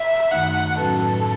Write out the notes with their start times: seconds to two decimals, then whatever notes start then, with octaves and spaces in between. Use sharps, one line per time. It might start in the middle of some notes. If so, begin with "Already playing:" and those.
Already playing: E5
0.31 F#2 D#3 A3 D#4 F#5
0.78 A2 F#3 C#4 F#4 A4 B4